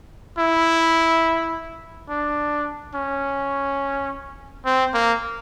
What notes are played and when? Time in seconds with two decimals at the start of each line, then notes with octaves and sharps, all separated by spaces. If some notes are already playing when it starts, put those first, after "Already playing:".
0.38 E4
2.09 D4
2.95 C#4
4.65 C4
4.94 A#3